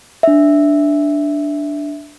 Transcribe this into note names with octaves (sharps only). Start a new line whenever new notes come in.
D4 E5